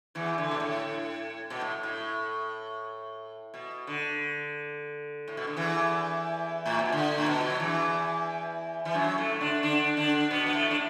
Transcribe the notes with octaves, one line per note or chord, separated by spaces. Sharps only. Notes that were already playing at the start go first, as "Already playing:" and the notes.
E2 E3
D3
B2
A2
B2
A2
A2
B2
D3
A2
B2
D3
E2 E3
A2
B2
D3
A2
B2
F#3
E2 E3
E3
F#2 F#3
A2 A3
D3 D4
D3 D4
D3 D4
B2 B3
B3
A2 A3
D4